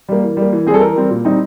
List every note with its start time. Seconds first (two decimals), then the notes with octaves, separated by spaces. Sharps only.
0.09 G3 A#3
0.23 E3
0.37 G3 A#3
0.52 E3
0.67 C4 G#4
0.70 G3 A4
0.81 E3 A#4
0.96 G3 C4
1.10 A#2
1.25 G3 C4 D#4